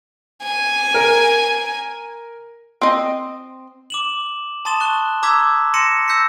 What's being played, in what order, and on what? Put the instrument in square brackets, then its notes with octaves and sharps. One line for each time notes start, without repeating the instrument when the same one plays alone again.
[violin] G#5
[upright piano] A#4 D7
[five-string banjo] C4 D#5
[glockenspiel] D6 E7 F#7
A5 C6 D#6 A6 E7 G7
C#6 F#6 G7
A#5 D6 E6 G#6 B6 G7
C6 A#6 C#7 D#7 E7
E6 G6 A#6 B6 C#7